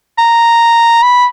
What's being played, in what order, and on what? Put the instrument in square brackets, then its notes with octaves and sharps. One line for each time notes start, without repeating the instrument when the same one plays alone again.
[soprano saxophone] A#5
B5